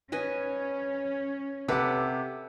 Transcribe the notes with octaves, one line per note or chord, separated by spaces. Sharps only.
C#4 B4 D#5 G#5
C3 A4 B4 F#5 D6